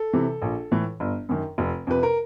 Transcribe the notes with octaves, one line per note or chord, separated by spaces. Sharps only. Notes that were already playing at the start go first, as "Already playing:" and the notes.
Already playing: A4
C3 E3
A#1
A2 E3
G1
F#2 D#3
F1
F2 C3 B4
A#4